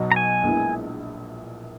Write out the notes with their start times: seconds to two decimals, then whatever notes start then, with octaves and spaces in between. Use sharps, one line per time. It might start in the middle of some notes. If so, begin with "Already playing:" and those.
Already playing: B1 B2 F#3 B3 F#4
0.12 A#5
0.16 G#5
0.43 A#1 A#2 G#3 B3 E4